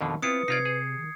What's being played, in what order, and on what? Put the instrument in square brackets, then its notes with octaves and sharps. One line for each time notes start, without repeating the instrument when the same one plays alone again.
[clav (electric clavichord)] F2 B2 D3 [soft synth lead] D#3
[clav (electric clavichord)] B3 E4 F4 [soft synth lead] C4 [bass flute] B4 [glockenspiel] D#6 C#7
[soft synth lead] C3 [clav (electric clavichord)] D#4 F4 D5 [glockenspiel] G#6 C7
[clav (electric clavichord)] G#4
[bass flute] D#3